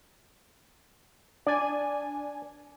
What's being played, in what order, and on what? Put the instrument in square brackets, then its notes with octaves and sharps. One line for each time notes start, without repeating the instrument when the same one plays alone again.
[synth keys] D4 G#5 [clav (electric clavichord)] D5